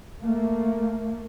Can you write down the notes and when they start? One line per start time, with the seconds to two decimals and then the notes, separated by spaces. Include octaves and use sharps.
0.21 A3 A#3